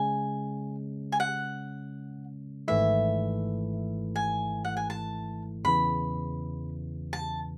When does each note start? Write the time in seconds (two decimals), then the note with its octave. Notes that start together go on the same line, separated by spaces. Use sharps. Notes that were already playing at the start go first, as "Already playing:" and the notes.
Already playing: C#3 G#3 C#4 G#5
1.12 G#5
1.20 F#5
2.68 G#1 G#2 E3 A3 E4 E5
4.16 G#5
4.64 F#5
4.77 G#5
4.90 A5
5.64 E2 C#3 E3 B5
7.13 A5